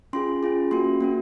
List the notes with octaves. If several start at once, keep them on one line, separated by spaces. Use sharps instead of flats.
C#4 F4 G#4 C6
C#4 F4 G#4
A#3 C#4 F#4 C6
A#3 C#4 F#4